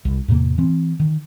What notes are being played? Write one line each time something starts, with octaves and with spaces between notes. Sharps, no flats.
C2
E2 A2 C3 A#3
E3 C4
D#3